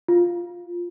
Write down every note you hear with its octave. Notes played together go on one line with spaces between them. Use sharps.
F4